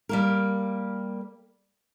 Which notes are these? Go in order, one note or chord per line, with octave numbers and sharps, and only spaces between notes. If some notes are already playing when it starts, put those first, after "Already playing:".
G3 A#3 A#4